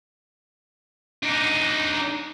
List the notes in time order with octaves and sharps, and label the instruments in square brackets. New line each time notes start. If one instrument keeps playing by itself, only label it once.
[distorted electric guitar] D4 D#4